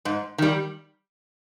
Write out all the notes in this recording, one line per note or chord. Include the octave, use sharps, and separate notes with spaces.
G#2
D#3 G3